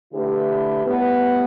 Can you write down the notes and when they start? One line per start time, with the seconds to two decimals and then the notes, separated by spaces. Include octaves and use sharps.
0.13 D3 A3 E4 G4 B4
0.84 A2 G3 B3